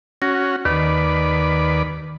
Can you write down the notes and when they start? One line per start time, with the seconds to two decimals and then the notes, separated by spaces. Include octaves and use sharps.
0.22 C#4 F#4 A#6
0.65 D#2 D#3 B4 D5